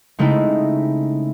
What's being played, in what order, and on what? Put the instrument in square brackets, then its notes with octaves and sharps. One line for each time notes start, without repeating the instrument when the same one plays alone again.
[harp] C#3 G#3 A3 C4 D#4 E4